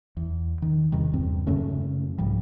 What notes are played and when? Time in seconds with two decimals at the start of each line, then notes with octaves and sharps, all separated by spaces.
0.17 E2
0.62 D#3
0.92 E2 C3 D#3 G3
1.14 E2 G2 C4
1.47 F#2 C#3 A3 C#4
2.18 C2 G#2 F3 G3